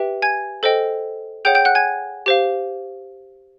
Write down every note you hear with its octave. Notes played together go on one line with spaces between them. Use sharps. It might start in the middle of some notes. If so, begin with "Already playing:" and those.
Already playing: G4 B4 E5 G5
G#5 G#6
A4 C5 D#5 G5
G#4 C#5 F#5 G5 G6
G5 G6
F#5 F#6
G#5 G#6
G4 C5 F5